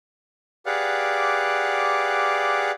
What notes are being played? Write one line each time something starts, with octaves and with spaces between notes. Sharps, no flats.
G4 G#4 B4 D5 F5 F#5